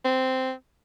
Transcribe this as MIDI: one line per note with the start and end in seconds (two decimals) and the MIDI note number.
0.05 0.53 60